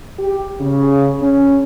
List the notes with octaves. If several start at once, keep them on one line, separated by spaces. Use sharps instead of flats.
G4
C#3
C#4